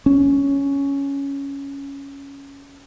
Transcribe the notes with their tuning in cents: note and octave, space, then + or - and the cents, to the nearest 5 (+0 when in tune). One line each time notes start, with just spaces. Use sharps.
C#4 +5